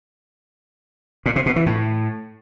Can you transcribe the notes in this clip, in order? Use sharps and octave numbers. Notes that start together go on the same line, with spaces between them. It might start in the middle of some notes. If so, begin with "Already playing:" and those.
A#2
C3
B2
E3
A2